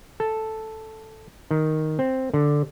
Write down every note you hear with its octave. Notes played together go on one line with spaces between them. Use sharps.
A4
D#3
C4
D3